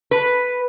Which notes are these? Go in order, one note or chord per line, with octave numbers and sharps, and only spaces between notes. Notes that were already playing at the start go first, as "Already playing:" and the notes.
B4